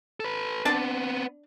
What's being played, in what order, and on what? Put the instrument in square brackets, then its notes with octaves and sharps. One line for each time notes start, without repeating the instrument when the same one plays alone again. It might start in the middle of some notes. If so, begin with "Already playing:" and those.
[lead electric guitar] A4 B4
[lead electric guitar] B3 C4 [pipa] D4 D5 A5